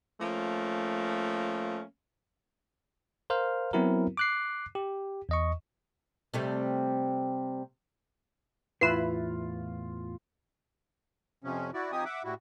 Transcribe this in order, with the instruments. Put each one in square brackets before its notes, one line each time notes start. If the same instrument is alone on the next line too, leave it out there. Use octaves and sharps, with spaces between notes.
[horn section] F3 A3 A#3 C#4
[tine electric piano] A#4 C5 F5 F6
F#3 B3 C4 E4 F#4 A#4
D6 F#6 C7
G4
E2 D#5 C#6
[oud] C3 G3 A3
[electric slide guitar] E2 A2 [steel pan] E4 B4 [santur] F4 [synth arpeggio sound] C7 E7
[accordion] F2 C3 F3 C#4
E4 F#4 D5
F3 C4 D#4 G4 G#5 D#6
E5 F#5 D6
A2 G3 E4 F#4